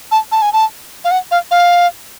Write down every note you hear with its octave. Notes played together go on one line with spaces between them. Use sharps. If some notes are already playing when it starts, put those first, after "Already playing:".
A5
A5
G#5
A5
F5
F#5
F5
F5